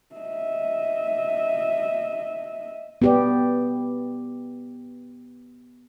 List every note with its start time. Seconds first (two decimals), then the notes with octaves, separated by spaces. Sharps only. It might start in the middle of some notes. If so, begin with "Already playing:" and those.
0.16 D#5 E5
3.02 B3 G4 D5